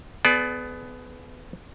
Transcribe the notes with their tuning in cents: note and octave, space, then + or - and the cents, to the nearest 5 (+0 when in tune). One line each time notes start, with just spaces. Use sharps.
B3 +20 G#4 +45 D5 +0